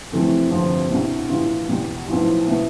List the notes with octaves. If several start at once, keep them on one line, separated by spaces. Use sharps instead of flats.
F2 C3 E3 A3 C4
G1 F2 C3 F3 C4
C2 B2 G3 D4
A2 E3 G3 B3 F4
E2 B2 G3
B1 A2 F3 B3
B2 B3 E4